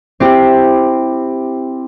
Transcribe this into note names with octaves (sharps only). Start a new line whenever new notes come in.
C4 E4 G4